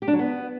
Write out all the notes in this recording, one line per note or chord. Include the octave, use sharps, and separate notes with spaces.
G4
D4
F#3
B3